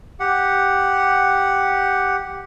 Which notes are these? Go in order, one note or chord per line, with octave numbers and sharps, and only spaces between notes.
G4 F#5